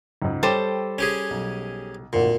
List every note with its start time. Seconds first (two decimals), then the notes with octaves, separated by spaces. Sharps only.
0.22 C#2 G#2
0.43 G3 A4 C5 C#5 G5 A6
0.98 C#4 G4 G#4
1.30 B1
2.13 G#1 D2 A#2